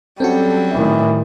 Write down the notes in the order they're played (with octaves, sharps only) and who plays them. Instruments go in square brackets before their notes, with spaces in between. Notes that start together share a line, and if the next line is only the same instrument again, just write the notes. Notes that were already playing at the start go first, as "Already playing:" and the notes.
[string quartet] F#3 G3 [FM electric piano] C4 C#4 F#4 [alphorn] A4
[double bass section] A2 D#3 [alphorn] E3